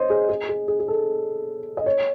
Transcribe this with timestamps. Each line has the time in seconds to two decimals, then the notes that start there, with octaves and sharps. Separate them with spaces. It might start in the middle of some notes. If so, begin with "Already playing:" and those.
Already playing: C5 C#5 D#5
0.10 G#4
0.29 G#4
0.49 G#4
0.68 G#4
0.80 G#4
0.88 A4
1.77 D#5
1.86 C#5